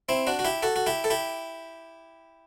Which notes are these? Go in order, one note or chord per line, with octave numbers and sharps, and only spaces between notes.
C4 E4
D4 F#4
F#4
E4 G4
F#4 A4
F#4
E4 G4
A4
E4 G4